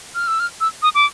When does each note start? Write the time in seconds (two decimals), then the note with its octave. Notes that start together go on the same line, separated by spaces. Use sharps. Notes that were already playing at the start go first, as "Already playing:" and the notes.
0.15 F6
0.27 E6
0.40 F6
0.61 E6
0.82 D#6
0.95 D6